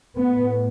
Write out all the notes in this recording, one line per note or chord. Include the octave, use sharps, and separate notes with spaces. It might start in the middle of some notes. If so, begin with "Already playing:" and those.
A2 B3